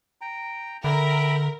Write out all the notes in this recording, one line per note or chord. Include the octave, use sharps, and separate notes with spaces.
G5 A#5
D3 A#4 E5 G5 B5